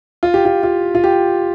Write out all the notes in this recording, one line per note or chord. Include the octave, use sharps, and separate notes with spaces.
F4
G4
F4
F4
F4
G4